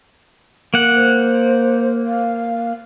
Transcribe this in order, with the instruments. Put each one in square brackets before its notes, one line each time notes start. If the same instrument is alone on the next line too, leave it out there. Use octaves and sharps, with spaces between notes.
[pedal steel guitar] A#3 F#5
[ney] C5
F5